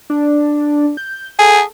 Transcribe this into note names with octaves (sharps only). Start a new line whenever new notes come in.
D4
G6
G#4 A4